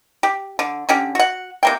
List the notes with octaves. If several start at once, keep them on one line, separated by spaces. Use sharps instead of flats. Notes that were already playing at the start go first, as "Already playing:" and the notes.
G4
D3
D3 C#4 G4
F#4 F#5
C3 A#3 G5